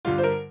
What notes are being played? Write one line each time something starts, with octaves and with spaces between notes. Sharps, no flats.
G2 D3 G3 F4
C5
A#4